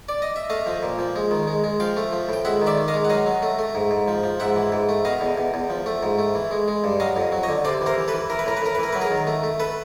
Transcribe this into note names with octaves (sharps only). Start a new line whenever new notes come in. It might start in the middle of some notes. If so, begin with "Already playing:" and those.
D5
D#5
E5
A3 D#5 F5
F3
A#2
F3
G#3
D#3
G#3
G#3
F3 F5 G5
A3
F3
A2 G5
G#3 E5 F#5
D#3
D5 E5
D#3
D#5 F5
G#3
F#5
F#3 D#5 F5
F#3
A3
A3
G#2
G#2
F3
F3
G#2 E5 F#5
E3
G#2
A3
B2 D#5 F5
E2
E2
E2
F3
A3
G#2
A3
E3
G#3
G#3
G2
F#3 D#5 F5
F2
F#3
C#5 D#5
D3
C3 C5 D5
E3
A#4 C5
E3
A4 B4
E3
E3 A#4
B4
A2 A#4
B4
A2 A#4
B4
E3 A#4
F#3 B4
G#4 A#4
D#3
A3
A3
A4 B4